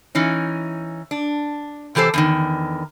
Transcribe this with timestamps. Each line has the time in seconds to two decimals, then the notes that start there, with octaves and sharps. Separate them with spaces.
0.15 E3 C#4 D#4
1.11 D4
1.95 C3 E3 G4 A4 C5
2.14 E2 D3 D#3